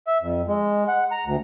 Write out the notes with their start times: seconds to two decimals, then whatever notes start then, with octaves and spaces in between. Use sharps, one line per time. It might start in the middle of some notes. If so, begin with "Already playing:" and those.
0.07 E5
0.22 F2
0.48 G#3
0.88 F#5
1.12 A#5
1.26 D2